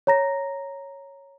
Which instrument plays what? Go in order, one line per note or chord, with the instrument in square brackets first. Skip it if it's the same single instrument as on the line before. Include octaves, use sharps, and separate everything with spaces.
[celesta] C#5 A#5 A#6